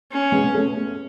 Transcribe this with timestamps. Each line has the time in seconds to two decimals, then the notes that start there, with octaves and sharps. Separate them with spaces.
0.12 C#4
0.32 G#3 B3
0.54 A3 C#4